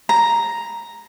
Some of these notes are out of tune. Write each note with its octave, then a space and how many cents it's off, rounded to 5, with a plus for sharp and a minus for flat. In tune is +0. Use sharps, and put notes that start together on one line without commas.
A#5 +0